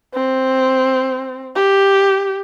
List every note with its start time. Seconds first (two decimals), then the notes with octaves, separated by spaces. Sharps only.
0.14 C4
1.56 G4